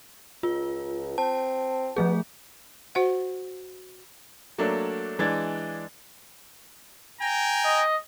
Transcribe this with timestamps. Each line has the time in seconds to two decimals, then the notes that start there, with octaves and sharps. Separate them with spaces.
0.43 C#2 F4
1.18 C4 A5
1.96 F3 A3 B3 G#4
2.95 F#4 C5 F#5
4.58 F#3 A3 A#3 D4
5.19 E3 G#3 D4 G#6 A6
7.19 G5 G#5 A#5
7.65 D#5